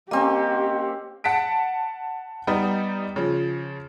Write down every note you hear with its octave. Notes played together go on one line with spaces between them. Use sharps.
A#3 C4 C#4 G4 D#5
F#5 A5 B6 D7
G3 B3 D#4
C#3 F3